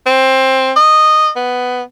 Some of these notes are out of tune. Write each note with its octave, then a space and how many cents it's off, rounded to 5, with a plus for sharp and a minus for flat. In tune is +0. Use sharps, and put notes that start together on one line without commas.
C4 +15
D#5 -10
B3 +10